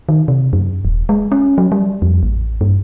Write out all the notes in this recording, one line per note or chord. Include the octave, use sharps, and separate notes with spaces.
D#3
C3
F#2
D#1
G#3
C#4
F#3
G3
F2
A1
G2